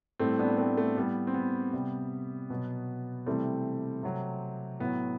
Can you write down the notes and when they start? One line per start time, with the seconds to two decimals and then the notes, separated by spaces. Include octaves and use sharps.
0.19 A2 G3 A3 C4
0.39 B3 D4
0.58 A3 C4
0.77 A3
0.96 A2 G3 B3
1.27 C4
1.34 B3
1.73 C3 G3
2.50 B2 F#3
3.26 C3 E3 G3 A3 C4
4.03 C3 F#3
4.80 A2 F#3 B3